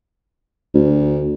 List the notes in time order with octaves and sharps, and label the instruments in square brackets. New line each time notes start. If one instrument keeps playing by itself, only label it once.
[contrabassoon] D2